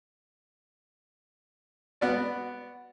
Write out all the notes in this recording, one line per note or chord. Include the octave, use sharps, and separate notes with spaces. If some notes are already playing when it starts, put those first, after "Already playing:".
B3 F#4 D5